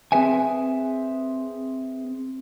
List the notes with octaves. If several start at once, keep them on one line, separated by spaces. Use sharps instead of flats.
C4 G#4 B4 E5 G#5